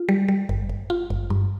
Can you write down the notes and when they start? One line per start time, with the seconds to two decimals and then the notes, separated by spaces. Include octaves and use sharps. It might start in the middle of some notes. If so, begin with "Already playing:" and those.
Already playing: F4
0.09 G3
0.28 G3
0.49 G1
0.69 G1
0.90 F4
1.10 G1
1.30 G2